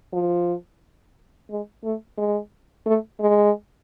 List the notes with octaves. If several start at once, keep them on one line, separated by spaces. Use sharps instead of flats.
F3
G#3
A3
G#3
A3
G#3